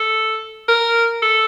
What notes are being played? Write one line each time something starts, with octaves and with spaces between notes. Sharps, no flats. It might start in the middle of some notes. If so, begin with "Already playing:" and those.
Already playing: A4
A#4
A4